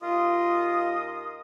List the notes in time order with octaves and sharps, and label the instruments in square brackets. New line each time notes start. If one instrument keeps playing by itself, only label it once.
[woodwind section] D#2 D#5 D#6 [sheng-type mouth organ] F4